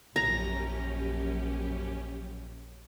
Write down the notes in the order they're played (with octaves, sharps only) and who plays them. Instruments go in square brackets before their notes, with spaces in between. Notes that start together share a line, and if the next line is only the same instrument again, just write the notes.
[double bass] A#1 [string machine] F#2 C#4 G4 [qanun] A#5